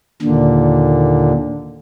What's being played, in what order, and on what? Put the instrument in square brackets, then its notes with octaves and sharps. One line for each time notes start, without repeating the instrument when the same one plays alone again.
[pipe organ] D#2 A#2 D3